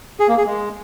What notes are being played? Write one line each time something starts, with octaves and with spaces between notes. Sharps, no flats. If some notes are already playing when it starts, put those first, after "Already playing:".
G#4
A#3
G#4
G#3